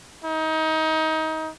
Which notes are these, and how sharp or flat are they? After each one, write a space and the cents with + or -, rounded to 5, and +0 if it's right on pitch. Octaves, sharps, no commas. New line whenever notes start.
D#4 +25